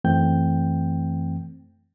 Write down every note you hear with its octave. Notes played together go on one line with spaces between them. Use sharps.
F#2 E3 A3 C4 G5 G6